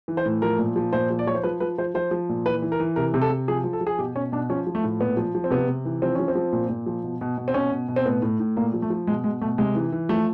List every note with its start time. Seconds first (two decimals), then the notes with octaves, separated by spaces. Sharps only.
0.08 E3
0.17 C5
0.26 A2
0.42 F3 A#4
0.59 A#2
0.76 F3
0.93 A#2 C5
1.10 F3
1.19 D5
1.27 F3 C#5
1.35 C5
1.43 F3 B4
1.60 F3 B4
1.78 F3 C5
1.95 F3 C5
2.11 F3
2.29 A#2
2.46 E3 B4
2.62 E3
2.72 A#4
2.80 E3
2.96 C3 A#4
3.14 C3
3.21 A4
3.30 C3
3.48 F3 G#4
3.64 F3
3.73 A4
3.81 F3
3.87 G#4
3.99 B2 G4
4.15 B2 C#4
4.32 B2 D4
4.50 F3 C#4
4.67 F3
4.75 A3
4.84 A2
5.00 A#2 B3
5.17 F3
5.35 F3
5.44 C4
5.51 C3 B3
5.68 C3
5.85 E3
6.02 F3 C4
6.15 F3 C#4
6.28 C4
6.35 F3
6.53 A#2
6.69 A#2
6.86 F3
7.04 B2
7.21 B2
7.38 B2
7.48 C4
7.54 B2 C#4
7.71 B2
7.88 B2
7.96 C4
8.06 A2 B3
8.22 A2
8.40 A2
8.57 A#2 A#3
8.74 F3
8.82 A3
8.90 F3
9.07 B2 G#3
9.24 B2 G#3
9.41 B2 A3
9.58 C3 G#3
9.75 E3
9.92 E3
10.09 F3 A3